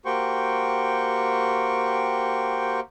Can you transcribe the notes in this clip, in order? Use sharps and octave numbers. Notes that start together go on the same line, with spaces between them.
A#3 F#4 G4 C5 G5 C#6